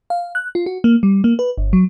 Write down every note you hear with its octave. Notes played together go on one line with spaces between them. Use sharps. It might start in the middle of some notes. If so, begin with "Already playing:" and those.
F5
F#6
F4
F#4
A#3
G3
A#3
B4
G1
F#3